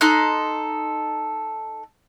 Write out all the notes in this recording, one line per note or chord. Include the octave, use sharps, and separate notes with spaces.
D#4 A4 C6 F#6